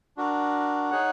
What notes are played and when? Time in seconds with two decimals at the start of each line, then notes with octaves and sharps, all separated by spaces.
0.17 D4 F#4 A#4
0.90 D#4 G#4 C#5 F#5